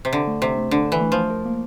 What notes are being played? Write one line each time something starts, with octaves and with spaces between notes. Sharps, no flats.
C3
D3 C5
A3
C3 C5
A3
D3 D4
C5
E3
A3
F3 A3
A#4
A#3